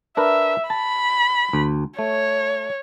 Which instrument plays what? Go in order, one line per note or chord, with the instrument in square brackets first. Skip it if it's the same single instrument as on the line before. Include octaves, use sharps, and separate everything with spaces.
[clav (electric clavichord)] D4 A#4 B4 [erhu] E5
[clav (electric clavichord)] A5 [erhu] B5
[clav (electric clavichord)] D2
[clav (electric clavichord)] A3 [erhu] C#5